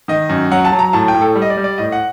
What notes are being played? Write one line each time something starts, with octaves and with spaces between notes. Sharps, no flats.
D#3 D#5
F#2
F#3 F#5
A5
F#3
A#5
A2 A5
G5
A2
A4
G3
D#5
D5
G3
D5
A2 D#5
F#5